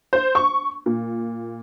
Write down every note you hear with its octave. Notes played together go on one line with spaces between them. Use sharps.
C5
C#6
A#2